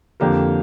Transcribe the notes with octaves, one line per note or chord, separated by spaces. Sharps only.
F2 D3 A#3 G4 A#4